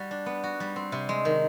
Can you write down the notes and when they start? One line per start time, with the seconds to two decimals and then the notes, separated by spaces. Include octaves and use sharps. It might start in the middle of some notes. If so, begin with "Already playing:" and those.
Already playing: G3 F#4
0.11 D4
0.26 B3
0.43 F#4
0.60 G3
0.76 C4
0.92 C3
1.09 G#3
1.25 D#3